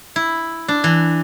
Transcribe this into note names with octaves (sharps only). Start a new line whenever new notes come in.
E4
D4
E3